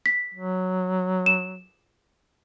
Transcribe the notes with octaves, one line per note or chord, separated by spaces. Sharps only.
B6
F#3
E7